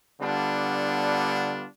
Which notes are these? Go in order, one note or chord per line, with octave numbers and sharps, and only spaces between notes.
D3 G3 B3 D4 F4